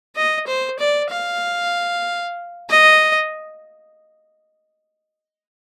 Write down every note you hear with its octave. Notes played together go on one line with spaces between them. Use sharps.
D#5
C5
D5
F5
D#5